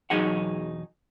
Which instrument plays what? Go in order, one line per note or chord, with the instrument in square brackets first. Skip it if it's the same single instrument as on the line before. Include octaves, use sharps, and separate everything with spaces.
[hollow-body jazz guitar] B1 E2 F#3 D#4 G#4 F#5